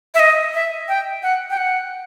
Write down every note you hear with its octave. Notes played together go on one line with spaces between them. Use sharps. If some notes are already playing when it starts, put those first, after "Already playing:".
E5
D#5
E5
G5
F#5
G5
F#5